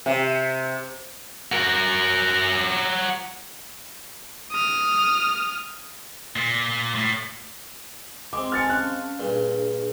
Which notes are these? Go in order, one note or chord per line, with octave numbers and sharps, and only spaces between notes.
C3
F#4 A#4
D#6 F6
A#2
A2
G#3 C4 D6
G#5 A5 F6 A6 C#7
C#4 F5 A5 F#6
G2 A#2 D4 G#4